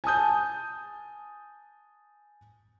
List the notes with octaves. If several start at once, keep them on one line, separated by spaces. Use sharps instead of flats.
G#5 A5 D#6 G6